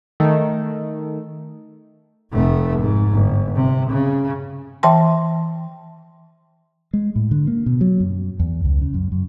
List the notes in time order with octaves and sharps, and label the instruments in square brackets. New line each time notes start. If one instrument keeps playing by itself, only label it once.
[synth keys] D#3 A3
[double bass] F1 A3
G#2
G1
C3
C#3
[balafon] E3 E5 G5 A5 C6
[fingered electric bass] G#3
A2
D3
A#3
B2
F#3
F#2
E2
C#2
C#3
F#2
F#2